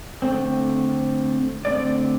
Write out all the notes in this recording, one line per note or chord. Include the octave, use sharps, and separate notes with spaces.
D3 A3 C4
D3 A3 C4 D5